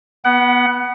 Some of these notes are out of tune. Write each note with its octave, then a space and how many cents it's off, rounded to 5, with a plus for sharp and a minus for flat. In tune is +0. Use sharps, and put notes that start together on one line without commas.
B3 -15 F#5 +20